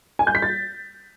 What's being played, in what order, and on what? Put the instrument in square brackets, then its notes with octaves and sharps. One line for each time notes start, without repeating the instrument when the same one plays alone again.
[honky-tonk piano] G#5
G6
B6
A6